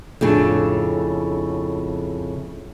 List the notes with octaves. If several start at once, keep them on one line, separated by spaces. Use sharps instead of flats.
F2 A2 C#3 D4